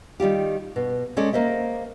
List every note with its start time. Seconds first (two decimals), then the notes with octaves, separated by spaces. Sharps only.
0.20 D#3 G3 F4 G4
0.76 B2
1.17 G#3 C#4 A4 D5
1.33 A#3 C5 D#5 E5